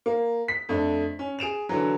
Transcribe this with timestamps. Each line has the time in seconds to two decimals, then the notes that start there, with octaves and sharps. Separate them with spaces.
0.06 A#3
0.48 B6
0.69 F2 A3 D4
1.19 C#4
1.39 G#4 D7 E7 F7
1.69 D3 E3 F#3